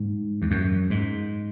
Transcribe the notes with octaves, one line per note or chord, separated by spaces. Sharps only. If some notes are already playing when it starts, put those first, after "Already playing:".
Already playing: G#2
E2
F#2
G#2